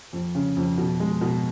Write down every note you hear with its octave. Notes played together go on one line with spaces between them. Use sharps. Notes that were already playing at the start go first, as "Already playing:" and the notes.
F2
C#3
F2
B2
G#3
B2